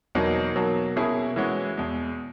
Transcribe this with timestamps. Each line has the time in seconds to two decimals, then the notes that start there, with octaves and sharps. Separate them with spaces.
0.15 E2 B2 F#3 A#3 D#4
0.55 B2 F#3 A#3
0.96 B2 A#3 C#4 E4 G#4
1.36 E3 G#3 C#4 F#4
1.77 E2 B2 G#3